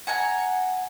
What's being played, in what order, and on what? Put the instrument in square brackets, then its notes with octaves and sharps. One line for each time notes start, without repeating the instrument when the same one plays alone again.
[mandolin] F#5 G#5 A#5